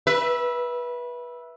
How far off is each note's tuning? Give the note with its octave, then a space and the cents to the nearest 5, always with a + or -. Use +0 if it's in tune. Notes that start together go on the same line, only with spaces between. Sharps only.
B4 -20 E5 +0